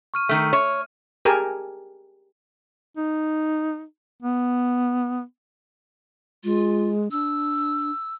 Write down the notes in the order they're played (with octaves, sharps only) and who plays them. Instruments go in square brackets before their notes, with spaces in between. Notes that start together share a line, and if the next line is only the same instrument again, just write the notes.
[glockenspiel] C#6 F6 D#7
[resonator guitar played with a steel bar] D#3 A3
C#5
[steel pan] G4 G#4 A#4 G#5 A5
[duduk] D#4
B3
[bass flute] G#3 [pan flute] F4
[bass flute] D4 [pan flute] E6